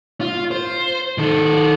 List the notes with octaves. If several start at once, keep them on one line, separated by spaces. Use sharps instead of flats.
F4
C5
D#3 A4